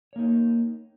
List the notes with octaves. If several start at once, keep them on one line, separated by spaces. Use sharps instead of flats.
A#3 D#4 C#5